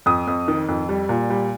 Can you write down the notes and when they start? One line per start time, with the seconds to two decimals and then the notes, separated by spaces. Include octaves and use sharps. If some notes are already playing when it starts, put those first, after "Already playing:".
0.06 F2 D#6
0.27 F2
0.48 D#3
0.69 F2
0.89 G3
1.09 A#2
1.30 G3